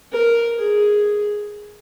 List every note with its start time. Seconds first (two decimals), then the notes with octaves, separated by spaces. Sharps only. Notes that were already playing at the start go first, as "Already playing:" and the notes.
0.13 A#4
0.58 G#4